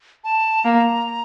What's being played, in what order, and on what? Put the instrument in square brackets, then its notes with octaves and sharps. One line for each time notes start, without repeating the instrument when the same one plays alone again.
[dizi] A5
[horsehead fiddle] A#3 [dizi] A#5